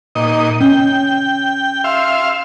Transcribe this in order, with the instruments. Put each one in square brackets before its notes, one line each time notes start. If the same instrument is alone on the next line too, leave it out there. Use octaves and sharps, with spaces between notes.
[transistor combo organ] A#2 D#4 D#5
[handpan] C#4 [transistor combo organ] G5
[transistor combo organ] E5 F5 C6